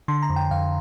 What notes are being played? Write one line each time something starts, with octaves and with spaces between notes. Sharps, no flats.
D3 C6
A#5
F2
G5
F2 F5